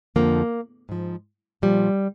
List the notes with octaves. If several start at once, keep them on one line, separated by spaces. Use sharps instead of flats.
F2 D3 F3 A#3
G#2 F3
A#2 F3 G3